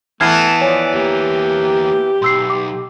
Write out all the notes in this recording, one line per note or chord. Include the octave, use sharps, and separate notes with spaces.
E3 A3 B3 A5 F6 G#6 C7
F3 C#5 D5 G#5
E2 A#3 G4
B1 C6 E6 C7
D6